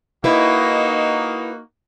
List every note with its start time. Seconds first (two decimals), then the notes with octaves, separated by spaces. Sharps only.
0.24 A#3 D#4 E4 F#4 B4